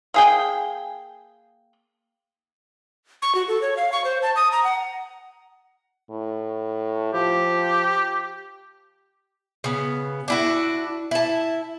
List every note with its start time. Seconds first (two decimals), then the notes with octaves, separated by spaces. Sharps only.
0.14 A#3 G#4 G5
3.22 C#6
3.35 F#4
3.48 A4
3.62 C#5
3.77 F5
3.92 C#6
4.05 C5
4.22 A5
4.36 D#6
4.52 A#5
4.64 F#5
6.10 A2
7.14 F3 G4
9.64 C#3 B3
10.28 D4 E4 F#4
11.11 E4 A5